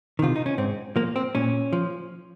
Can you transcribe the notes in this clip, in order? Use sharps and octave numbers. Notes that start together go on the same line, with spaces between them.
C3 D#3 F4
D#4
C#4
G#2 C4
F3 A#3
C4
A#2 C#4
F3